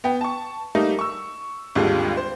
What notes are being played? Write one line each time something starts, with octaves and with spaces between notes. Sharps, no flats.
B3 G5
A5 C#6
G3 A3 A#3 D#4
C#6 E6
G#1 D#2 D3 G3 G#3 F4
C5